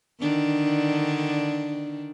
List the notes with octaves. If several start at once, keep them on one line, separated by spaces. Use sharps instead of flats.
D3 D#3 D4